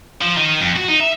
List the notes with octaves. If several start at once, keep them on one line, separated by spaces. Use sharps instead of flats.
F3
D#3
F2
F#4
D#4
E5